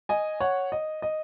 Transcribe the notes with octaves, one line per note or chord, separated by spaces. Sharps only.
D#5 G#5
C#5 F#5
D#5
D#5